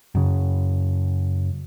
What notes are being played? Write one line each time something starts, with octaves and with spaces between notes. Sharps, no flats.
F#2 C#3